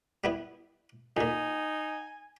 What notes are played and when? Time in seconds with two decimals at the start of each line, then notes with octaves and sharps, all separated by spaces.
0.24 G3 B3 E4
1.17 F2 A#2 D#4 G#5